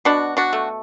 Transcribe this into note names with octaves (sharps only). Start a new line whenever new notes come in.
B2 D4 F#4
D4 F#4
A3